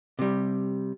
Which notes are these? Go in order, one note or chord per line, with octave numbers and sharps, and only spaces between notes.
C3 G3